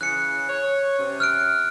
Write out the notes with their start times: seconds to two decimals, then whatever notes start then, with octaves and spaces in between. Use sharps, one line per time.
0.01 C#3 E3 F#6 C#7
0.49 C#5
0.99 C3 C#4
1.20 F6 F#6 D7